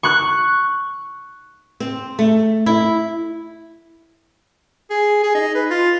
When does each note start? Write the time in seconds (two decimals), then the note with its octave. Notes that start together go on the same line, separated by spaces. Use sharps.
0.03 C#6 F#6
1.80 C4
2.19 A3
2.66 E4
4.90 G#4
5.24 G#4
5.35 D#4
5.55 B4
5.70 F4